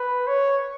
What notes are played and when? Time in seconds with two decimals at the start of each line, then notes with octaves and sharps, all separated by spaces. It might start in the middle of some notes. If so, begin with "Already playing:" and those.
Already playing: B4
0.27 C#5